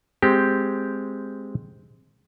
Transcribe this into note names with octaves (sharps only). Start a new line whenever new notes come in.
G#3 C4 G4